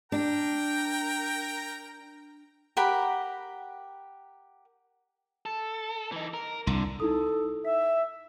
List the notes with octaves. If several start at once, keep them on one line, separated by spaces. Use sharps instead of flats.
D4 A#4 G5 A#5
G4 A#4 F#5 B5
A4
E3 D#4
A#4
C2 D3
D#4 E4 A4 D#6
E5 B6